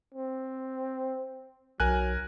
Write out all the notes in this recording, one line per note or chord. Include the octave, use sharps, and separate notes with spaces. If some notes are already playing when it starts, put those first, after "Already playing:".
C4
B1 F#3 A#4 G#5 F#6